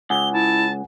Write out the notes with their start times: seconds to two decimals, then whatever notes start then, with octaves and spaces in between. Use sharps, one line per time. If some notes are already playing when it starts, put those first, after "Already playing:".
0.10 C#2 F#5 G#5 G7
0.33 E4 A5